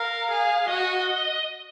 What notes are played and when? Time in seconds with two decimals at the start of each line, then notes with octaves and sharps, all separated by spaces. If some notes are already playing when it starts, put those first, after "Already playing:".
Already playing: A#4 F5
0.31 G#4
0.68 F#4 D#5